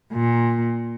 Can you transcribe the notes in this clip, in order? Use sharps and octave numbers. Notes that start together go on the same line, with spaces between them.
A#2